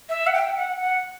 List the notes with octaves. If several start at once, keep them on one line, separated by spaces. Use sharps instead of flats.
E5
F#5
G5
F#5
F#5